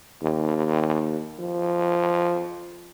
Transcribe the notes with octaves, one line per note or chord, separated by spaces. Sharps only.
D#2
F3